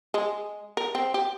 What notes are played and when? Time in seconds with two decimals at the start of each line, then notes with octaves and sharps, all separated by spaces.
0.14 G#3
0.77 A#4
0.95 C4
1.14 G4